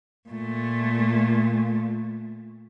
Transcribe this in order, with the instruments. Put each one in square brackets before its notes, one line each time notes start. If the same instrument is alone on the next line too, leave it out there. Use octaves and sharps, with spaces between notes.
[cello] A#2 A3